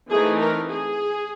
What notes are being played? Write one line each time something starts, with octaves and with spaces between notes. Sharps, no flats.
E3 A3 C4 D#4 G#4
A#4
G#4